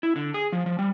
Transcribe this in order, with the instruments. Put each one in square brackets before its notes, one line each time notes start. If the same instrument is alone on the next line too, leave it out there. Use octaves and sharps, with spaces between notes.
[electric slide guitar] E4
D3
G#4
F3
F3
G3